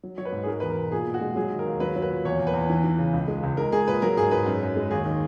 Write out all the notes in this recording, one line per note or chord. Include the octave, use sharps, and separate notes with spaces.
F#3
F#3 C#5
B4
G#2
G#4
G#3 A#4
E2 B4
A#4
B2
A#2 G#4
A#2
F#4
G#3
F#3 G#4
D#3
A#4
D#2
F#3 B4
F#3
B4
A#2
E2 C#5
E2
B4
E2
E3
E3
C#3
C#2
G#3
C#2
G#3 A#4
G#3 G#4
A#2 B4
F#3 A#4
G#2 G#4
G#2 B4
F#2
F#2
G#3
D#2 G#4
D#3